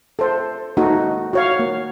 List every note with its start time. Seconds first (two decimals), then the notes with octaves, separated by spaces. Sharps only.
0.19 A4 C5
0.77 A#3 D#4 F#4 A4
1.33 F#4 C#5 F5
1.59 A#3